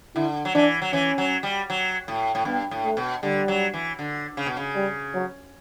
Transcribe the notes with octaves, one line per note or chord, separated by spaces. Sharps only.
D3 E4
F#3
E3 D4
F#3
E3 C#4
F#3
G3
F#3
A2
A2
G2 B3
A2
A3
B2
D3 G3
F#3
E3
D3
C#3
B2
C#3
G3
F#3